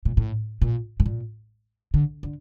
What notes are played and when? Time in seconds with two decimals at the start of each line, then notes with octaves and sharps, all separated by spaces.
0.05 A#2
0.17 A2
0.62 A#2
1.00 A2
1.06 A#2
1.94 D3
2.23 D3